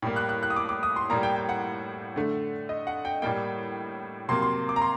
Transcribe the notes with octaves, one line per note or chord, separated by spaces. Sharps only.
A2 G3 A#3
F#6
F#6
F#6
D#6
D6
D6
D#6
C6
A2 G3 A#3 A#5
G5
G5
F#5
D3 A3
D#5
F#5
G5
A2 G3 A#3 G5
C3 F#3 A#3 C6
C6
D6
A#5
C6